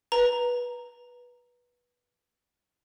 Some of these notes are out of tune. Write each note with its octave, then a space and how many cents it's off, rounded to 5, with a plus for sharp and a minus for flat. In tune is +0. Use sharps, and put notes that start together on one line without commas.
B4 -15 A#5 +0